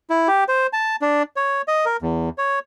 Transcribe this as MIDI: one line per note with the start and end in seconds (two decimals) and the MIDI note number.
0.10 0.28 64
0.28 0.44 67
0.48 0.67 72
0.73 0.96 81
1.02 1.23 62
1.36 1.62 73
1.68 1.85 75
1.85 1.97 70
2.02 2.29 40
2.38 2.59 73